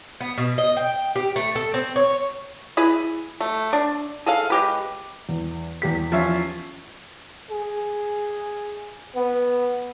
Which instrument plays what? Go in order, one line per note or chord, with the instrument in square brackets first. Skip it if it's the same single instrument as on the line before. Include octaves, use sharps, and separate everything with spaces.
[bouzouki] B3
B2
D#5
G5
G4
A3
A4
C4
C#5
[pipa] E4 G#4 B4 B5
A3
D4
G#4 A4 F5
G#3 G4 B4
[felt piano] E2
E2 G4 B6
[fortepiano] F3 C#4 E5
[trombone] G#4
B3